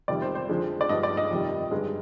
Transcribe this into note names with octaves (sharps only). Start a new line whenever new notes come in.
F2 C3 D#3 G3 D5
C5
C5
F2 D3 F3 G#3
D5
G2 F3 G#3 D#5
D5
D#5
F2 C3 D#3 G3
G2 D3 G#3